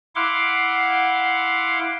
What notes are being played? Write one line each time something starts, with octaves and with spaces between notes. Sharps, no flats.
E4 F5 F#5 C6 D6